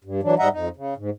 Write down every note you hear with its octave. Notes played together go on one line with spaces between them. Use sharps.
G2
E3 F#3 D4
G#2 G3 D#5 E5 F#5 A#5
F2 D#4
C#3
G#2